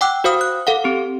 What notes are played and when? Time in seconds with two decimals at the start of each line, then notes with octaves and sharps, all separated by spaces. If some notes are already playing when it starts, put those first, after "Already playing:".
0.01 F#5 G5 D6 E6 F#6
0.24 F#4 C5 F5 D#6
0.41 F#6
0.67 A4 F5 F#5
0.84 C4 G4